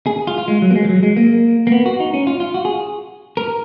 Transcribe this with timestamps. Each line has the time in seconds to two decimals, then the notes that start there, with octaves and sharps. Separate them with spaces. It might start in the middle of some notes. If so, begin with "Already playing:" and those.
0.07 G#4
0.27 F4
0.38 F4
0.48 G#3
0.62 F#3
0.71 A#3
0.75 G#3
0.84 F3
0.89 F#3
1.03 G#3
1.17 A#3
1.67 A#3
1.72 B3
1.86 F#4
2.00 D#4
2.14 C#4
2.27 F4
2.40 F4
2.54 F#4
2.65 G#4
3.37 A#4